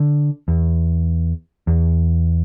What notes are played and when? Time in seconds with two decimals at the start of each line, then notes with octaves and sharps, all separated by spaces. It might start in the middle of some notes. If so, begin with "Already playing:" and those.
Already playing: D3
0.48 E2
1.67 E2